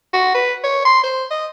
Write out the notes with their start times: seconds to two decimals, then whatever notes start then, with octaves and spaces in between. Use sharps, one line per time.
0.14 F#4
0.34 B4
0.63 C#5
0.85 C6
1.03 C5
1.31 D#5